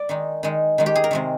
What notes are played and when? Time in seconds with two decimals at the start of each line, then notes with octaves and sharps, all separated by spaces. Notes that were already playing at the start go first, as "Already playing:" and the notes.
Already playing: D5
0.09 D#3 G#3 D#4
0.43 D#3 G#3 D#4
0.78 D#3 G#3 D#4
0.86 G4
0.96 G#4
1.04 A#4
1.11 C3 D#3 G#3 C4